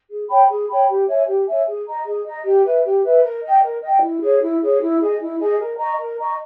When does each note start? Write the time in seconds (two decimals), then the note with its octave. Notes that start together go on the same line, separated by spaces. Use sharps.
0.08 G#4
0.28 C#5 G5 B5
0.48 G#4
0.68 C#5 G5 B5
0.87 G4
1.06 C#5 E5 G#5
1.27 G4
1.46 C#5 E5 G#5
1.67 G#4
1.86 D#5 A#5
2.05 G#4
2.25 D#5 A#5
2.45 G4
2.65 B4 E5
2.84 G4
3.04 B4 E5
3.23 A#4
3.42 D#5 G5
3.62 A#4
3.82 D#5 G5
4.02 E4
4.22 G#4 C#5
4.42 E4
4.62 G#4 C#5
4.81 E4
5.00 G#4 D#5 G#5
5.20 E4
5.40 G#4 D#5 G#5
5.60 A#4
5.78 D#5 A#5 C#6
5.99 A#4
6.18 D#5 A#5 C#6